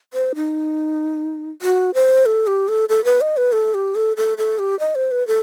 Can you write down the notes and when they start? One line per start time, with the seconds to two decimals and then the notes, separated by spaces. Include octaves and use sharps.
0.14 C5
0.35 D#4
1.62 F#4
1.94 C5
2.26 A4
2.47 G4
2.68 A4
2.89 A4
3.05 B4
3.21 D#5
3.37 B4
3.52 A4
3.74 G4
3.95 A4
4.17 A4
4.38 A4
4.59 G4
4.79 D#5
4.95 C5
5.11 B4
5.27 A4